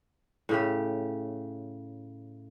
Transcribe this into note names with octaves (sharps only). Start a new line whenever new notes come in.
A2 C#3 G4